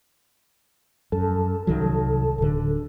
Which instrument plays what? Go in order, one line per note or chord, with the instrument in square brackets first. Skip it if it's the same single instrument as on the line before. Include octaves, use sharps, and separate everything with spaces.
[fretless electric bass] F#2 [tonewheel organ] A4
[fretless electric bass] C2 D#3 F#3
D1 D3